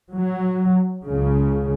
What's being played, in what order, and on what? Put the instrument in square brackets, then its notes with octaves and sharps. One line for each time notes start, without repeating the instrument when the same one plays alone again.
[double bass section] F#3
C#2 C#3